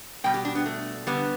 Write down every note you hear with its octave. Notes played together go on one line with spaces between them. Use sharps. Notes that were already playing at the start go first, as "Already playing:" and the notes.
B2 G3 G5
G4
D4
B3
A3
D3 G3 B3